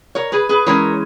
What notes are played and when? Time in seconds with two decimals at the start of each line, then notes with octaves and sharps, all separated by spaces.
0.15 A#4 C#5
0.32 G#4 B4
0.49 G#4 B4
0.66 E3 G#3 C#4 A#4 C#5